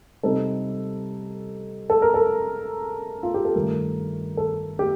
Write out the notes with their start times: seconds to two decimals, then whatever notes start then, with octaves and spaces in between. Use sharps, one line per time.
0.23 C3 G3 C4 D#4 A4
1.90 A4
2.02 A#4
2.14 A4
3.23 F4
3.34 G4
3.45 A4
3.55 G2 D#3 A3 A#4
4.37 A4
4.79 G4